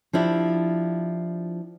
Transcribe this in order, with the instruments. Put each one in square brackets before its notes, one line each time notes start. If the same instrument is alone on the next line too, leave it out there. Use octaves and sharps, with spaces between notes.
[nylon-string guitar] F3 D4 E4 G4